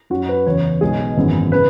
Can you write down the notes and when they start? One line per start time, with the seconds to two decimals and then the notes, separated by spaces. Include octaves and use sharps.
0.10 F#2 F#3 C#4 F#4
0.29 B4
0.46 E2 C#3 E3 C#5
0.81 B1 B2 G#3 G#4
1.17 G#1 F#2 E3 B3
1.52 C#3 B4